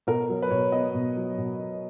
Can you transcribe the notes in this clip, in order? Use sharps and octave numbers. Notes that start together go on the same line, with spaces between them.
B2 A#4
F#3
B4
B2 C#5
B3 D#5
B2
F#3
B2
B3